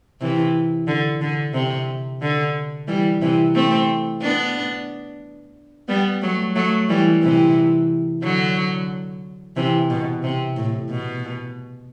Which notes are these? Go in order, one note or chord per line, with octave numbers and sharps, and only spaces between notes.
C3 E3
D3
D3
C3
D3
E3 G3
C3 E3
A3 C4
B3 D4
G3 B3
F#3 A3
F#3 A3
E3 G3
C3 E3
D3 F#3
C3 E3
B2
C3
A2
B2